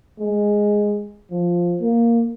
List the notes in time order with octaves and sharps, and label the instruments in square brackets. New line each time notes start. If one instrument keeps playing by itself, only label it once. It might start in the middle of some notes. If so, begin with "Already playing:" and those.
[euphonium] G#3
F3
A#3